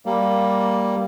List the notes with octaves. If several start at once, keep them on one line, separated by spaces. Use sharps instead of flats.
G3 A#3